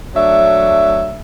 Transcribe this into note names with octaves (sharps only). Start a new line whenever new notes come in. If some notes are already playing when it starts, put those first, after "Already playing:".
F#3 A3 D4 E5